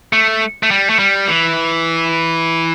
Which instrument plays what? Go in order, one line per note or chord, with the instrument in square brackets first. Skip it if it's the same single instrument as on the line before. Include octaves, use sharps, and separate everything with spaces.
[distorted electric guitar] A3
A3
G3
A3
G3
E3